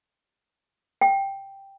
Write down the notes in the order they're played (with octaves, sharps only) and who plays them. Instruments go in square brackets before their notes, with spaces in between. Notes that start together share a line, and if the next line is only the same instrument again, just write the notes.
[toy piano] G5